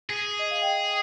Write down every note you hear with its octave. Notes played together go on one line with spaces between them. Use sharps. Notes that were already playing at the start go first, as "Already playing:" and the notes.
G#4
D#5
F5
G5